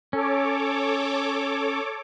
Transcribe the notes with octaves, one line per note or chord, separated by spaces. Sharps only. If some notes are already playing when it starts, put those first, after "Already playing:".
C#4 A4 C#5 D6